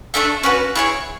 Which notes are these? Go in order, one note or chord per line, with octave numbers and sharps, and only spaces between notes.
A3 D4 A4 E5
C#4 F#4 B4
E4 G#4 C#5